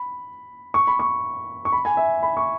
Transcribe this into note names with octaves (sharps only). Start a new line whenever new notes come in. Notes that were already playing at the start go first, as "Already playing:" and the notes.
Already playing: B5
C#6
B5
C#6
C#6
B5
G#5
E5
B5
C#6